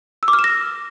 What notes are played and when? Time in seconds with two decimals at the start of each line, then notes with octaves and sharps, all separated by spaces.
0.23 E6
0.28 D6
0.33 F6
0.39 E7
0.44 A#6